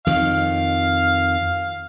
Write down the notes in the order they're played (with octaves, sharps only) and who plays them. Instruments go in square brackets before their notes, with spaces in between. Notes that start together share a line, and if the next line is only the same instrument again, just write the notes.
[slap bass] F2 D#3 [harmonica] F5